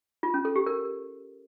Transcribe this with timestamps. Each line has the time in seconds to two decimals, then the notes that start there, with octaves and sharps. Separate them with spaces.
0.23 F4
0.34 C#4
0.45 A4
0.56 G4
0.66 A#4